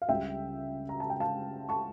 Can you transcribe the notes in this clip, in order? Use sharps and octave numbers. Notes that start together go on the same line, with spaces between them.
F5
C#2 C#3 G3 E5 G5
A#5
A5
G5
F5 A5
A5 C#6